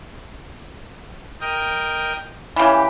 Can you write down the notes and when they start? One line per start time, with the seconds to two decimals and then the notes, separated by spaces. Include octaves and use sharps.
1.41 A#4 D#5 G5
2.56 C#3 E3 G4